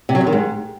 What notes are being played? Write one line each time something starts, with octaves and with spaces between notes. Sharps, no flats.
C3
F#3
F#2
D#3
G#2